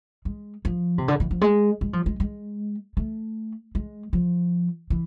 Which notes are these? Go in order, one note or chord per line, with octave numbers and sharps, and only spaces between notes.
G#3
F3
C3
D3
E3
F3
G#3
G#3
F3
G#3
G#3
A3
G#3
F3
E3